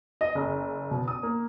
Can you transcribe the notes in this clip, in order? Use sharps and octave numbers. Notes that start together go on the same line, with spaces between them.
D#5
F#1
B2
D#6
A#3